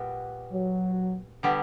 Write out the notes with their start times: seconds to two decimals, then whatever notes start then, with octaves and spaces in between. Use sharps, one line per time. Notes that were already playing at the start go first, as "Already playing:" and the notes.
Already playing: A#2 G3 B3 F#4
0.52 F#3
1.43 D3 G3 B3